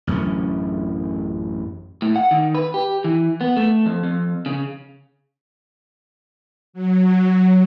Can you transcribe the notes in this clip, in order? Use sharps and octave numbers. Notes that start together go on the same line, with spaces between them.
A1 F#2 D3 C#4
A2
F#5
D#3
B4
G4
E3
B3
A3
F2
F2
C#3
F#3